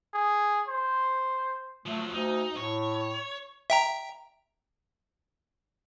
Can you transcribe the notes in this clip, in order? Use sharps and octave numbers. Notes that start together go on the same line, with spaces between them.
G#4
C5
F3 F#3 A3
D2 D#4
A2 C#5
E5 G5 A#5